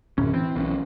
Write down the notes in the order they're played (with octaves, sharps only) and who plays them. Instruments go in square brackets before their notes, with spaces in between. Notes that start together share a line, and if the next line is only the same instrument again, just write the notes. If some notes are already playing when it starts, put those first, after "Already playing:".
[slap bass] D1 [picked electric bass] F#2 C#4
[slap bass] E3 [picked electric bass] C4
[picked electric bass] B1 C#4